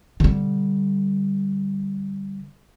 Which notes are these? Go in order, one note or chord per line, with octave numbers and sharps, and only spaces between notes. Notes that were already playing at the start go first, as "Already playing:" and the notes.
D3 G3